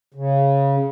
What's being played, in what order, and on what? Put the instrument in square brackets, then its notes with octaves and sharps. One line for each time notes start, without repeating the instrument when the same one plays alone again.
[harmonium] C#3